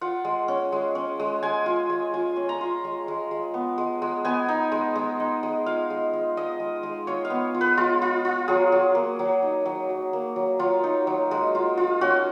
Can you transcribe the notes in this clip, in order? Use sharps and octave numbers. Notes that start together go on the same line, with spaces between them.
F4 F#5
G#3
C#4
G#3
C#4
G#3
G#3 G#5
F4
G#3
F4 G#5
C#4
A#5
F4
G#3
G#3
G#3
B3
G#3
G#3
B3 G#5
D#4
G#3
G#3
D#4
G#3
F4 F5
G#3
G#3
G#3 D#5
G#3
G#3
F4 C#5
F5
B3
F4
B4
G#3 F4
F4
F4
F#3 G#4
F#3
A#3
F#3
D#4
F#3
F#3
A#3
F#3
F#3 F4
D#4
F#3
G#3
F4
F4
C#4 F#4